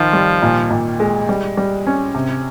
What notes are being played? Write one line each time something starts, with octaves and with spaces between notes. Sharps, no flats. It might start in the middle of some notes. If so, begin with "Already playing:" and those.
Already playing: D#3 F3 F4
G3
A#2
A#2
G#3
G3
G3
C#4
C3